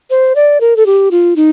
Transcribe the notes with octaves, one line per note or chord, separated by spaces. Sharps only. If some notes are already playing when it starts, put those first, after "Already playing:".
C5
D5
A#4
A4
G4
F4
D#4